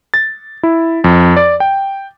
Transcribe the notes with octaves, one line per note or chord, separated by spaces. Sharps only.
A6
E4
F2
D5
G5